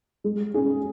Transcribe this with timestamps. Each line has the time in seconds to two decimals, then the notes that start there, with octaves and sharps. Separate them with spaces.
0.24 G#3
0.54 C#4 G#4